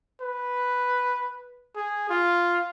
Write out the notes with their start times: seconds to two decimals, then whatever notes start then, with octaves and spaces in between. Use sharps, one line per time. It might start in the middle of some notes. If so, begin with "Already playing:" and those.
0.21 B4
1.76 G#4
2.09 F4